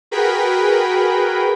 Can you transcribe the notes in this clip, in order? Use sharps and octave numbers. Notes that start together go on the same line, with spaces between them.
F#4 G#4 A#4 B4 G5 B5